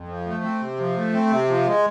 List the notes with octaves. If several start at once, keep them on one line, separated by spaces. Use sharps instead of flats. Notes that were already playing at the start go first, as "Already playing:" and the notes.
Already playing: F2
F3
A3
C4
C3
F3
A3
C4
C3
F3
G#3